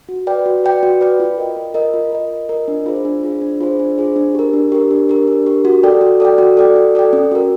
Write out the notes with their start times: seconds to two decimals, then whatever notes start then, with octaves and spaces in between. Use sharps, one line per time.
0.09 F#4
0.27 B4 D5 G5
0.46 F#4
0.64 B4 D5 G5
0.83 F#4
1.01 B4 D5 G5
1.20 F4
1.38 A#4 D#5
1.57 F4
1.74 A#4 D#5
1.93 F4
2.13 A#4 D#5
2.31 F4
2.49 A#4 D#5
2.68 D4
2.86 F4 G#4 C5
3.05 D4
3.23 F4 G#4 C5
3.41 D4
3.61 F4 G#4 C5
3.79 D4
3.98 F4 G#4 C5
4.16 D4
4.35 G4 A#4
4.53 D4
4.72 G4 A#4
4.91 D4
5.09 G4 A#4
5.28 D4
5.46 G4 A#4
5.65 F#4
5.83 A4 D5 G5
6.01 F#4
6.20 A4 D5 G5
6.38 F#4
6.57 A4 D5 G5
6.76 F#4
6.95 A4 D5 G5
7.13 C#4
7.32 F#4 A#4